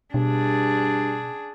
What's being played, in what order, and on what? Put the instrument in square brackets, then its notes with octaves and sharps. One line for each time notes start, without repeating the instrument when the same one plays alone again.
[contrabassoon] G2 [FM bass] B2 [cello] D4 G#4